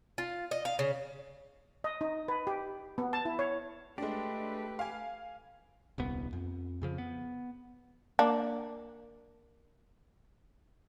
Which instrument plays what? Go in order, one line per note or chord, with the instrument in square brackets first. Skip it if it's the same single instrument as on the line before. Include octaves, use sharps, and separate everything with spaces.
[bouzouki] F4
D#5
F5
C#3
[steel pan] D#5
D#4
B4
G4
B3
A5
E4
C#5
[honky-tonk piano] G#3 D4 [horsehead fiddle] A3 B4 [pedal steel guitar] G4
[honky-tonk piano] F5 G#5
[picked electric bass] D#1 C2 B3
F2
F2 C#3 F3
B3
[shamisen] A#3 D4